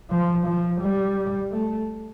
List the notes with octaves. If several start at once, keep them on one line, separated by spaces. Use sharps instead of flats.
F3
F3
G3
A3